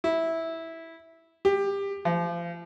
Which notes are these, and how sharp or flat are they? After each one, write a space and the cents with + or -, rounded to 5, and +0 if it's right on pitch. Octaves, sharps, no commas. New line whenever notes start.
E4 -10
G4 +20
F3 -30